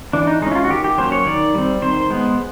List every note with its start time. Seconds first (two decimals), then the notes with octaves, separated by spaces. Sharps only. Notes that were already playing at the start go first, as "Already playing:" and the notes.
0.13 E3 D4
0.27 D#4
0.42 G#3 D#4
0.47 C#4 E4
0.55 F4
0.65 F#4
0.70 D#3 G4
0.84 G4
0.98 F#3 A#3 C#4 C5
1.12 C#5
1.26 D#3 D5
1.55 G3 C4
1.82 D#3 C5
2.10 G#3 B3